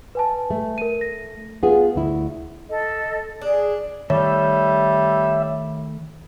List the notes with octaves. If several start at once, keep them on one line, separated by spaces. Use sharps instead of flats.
B4 G#5 A5
A3
A#4 D#7
A#6
B3 F4 G#4 F#5
D2 E4
A4 D#5
D4 G#4
D#3 G3 A3 C#5 E5 A5